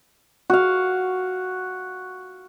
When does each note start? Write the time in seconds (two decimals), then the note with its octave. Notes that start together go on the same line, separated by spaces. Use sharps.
0.50 F#4 F5